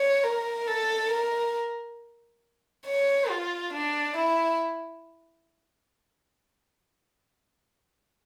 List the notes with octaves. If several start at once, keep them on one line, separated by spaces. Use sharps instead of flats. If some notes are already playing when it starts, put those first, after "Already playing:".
Already playing: C#5
A#4
A4
A#4
C#5
F4
D4
E4